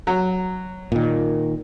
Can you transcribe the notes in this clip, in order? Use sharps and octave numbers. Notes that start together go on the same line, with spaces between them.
F#3
A#2 D#3